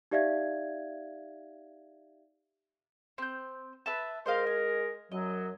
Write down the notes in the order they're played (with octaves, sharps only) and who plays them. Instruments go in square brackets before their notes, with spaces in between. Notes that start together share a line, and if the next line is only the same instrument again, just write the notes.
[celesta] D#4 G4 D5 E5 F5 G#6
[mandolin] C4 G6
B4 E5 A5
[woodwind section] G#3 A#4 [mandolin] C5 D#5 F5
[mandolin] G#5
[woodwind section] F#2 F#3 [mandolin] D#5